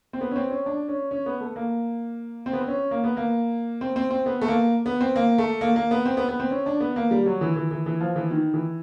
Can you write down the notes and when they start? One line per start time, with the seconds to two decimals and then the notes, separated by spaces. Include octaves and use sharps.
0.13 C4
0.21 B3
0.32 C#4
0.36 C4
0.51 C#4
0.66 D4
0.88 C#4
1.11 C#4
1.26 B3
1.41 A3
1.56 A#3
2.46 C4
2.53 B3
2.61 C4
2.68 C#4
2.91 A#3
3.04 B3
3.17 A#3
3.81 C4
3.96 C4
4.11 C4
4.26 B3
4.42 A3
4.48 A#3
4.86 B3
5.01 C4
5.16 A#3
5.38 A3
5.61 A#3
5.76 A#3
5.91 B3
6.06 C4
6.17 B3
6.29 B3
6.40 C4
6.51 C#4
6.66 D4
6.80 B3
6.96 A#3
7.11 G3
7.26 F#3
7.41 E3
7.56 E3
7.71 E3
7.86 E3
8.01 F3
8.16 E3
8.31 D#3
8.54 E3